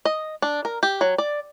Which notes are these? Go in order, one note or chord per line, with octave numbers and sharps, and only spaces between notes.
D#5
D4
A#4
G4
F#3
D5